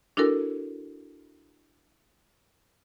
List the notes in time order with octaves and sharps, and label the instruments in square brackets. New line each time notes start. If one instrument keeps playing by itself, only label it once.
[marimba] D4 E4 F#4 A4 A#4